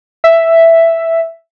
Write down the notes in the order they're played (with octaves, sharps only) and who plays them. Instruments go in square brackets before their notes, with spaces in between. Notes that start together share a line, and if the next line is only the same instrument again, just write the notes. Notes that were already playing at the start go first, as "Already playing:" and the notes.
[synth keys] E5